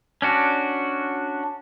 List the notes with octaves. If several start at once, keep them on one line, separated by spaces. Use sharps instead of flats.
C#4 D4 F#4